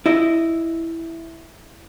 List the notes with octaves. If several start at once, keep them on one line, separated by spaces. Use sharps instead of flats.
E4 D#5